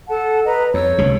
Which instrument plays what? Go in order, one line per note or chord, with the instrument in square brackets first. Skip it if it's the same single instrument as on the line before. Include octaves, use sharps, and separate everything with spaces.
[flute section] A4 F#5 A5
B4 D#5 A#5
[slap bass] F2 [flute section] C#5 E6
[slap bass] F1 C#2 C3